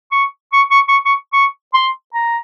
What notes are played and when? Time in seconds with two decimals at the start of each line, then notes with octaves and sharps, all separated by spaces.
0.12 C#6
0.53 C#6
0.71 C#6
0.88 C#6
1.05 C#6
1.33 C#6
1.74 C6
2.14 A#5